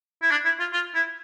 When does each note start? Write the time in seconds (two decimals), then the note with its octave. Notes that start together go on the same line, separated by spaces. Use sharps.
0.22 E4
0.31 D4
0.45 E4
0.60 F4
0.73 F4
0.95 E4